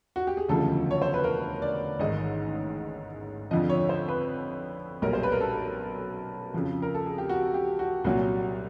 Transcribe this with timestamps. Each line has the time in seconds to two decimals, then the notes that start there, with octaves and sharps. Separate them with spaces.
0.16 F#4
0.27 G4
0.37 G#4
0.48 E1 D2 C#3 F3 A4
0.91 C#5
1.02 C5
1.14 B4
1.24 A#4
1.62 D5
1.99 A1 G#2 D#3 D#5
3.51 F2 D3 F3 D#5
3.69 C#5
3.89 C5
4.08 B4
5.02 B1 A#2 G3 A#4
5.13 C5
5.23 B4
5.32 A#4
5.41 A4
6.54 F2 C#3 F3
6.82 A#4
6.95 A4
7.06 G#4
7.18 G4
7.29 F#4
7.54 G4
7.79 F#4
8.04 C2 A#2 F#3 F#4